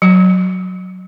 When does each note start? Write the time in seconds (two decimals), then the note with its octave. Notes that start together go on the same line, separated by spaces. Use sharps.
0.02 F#3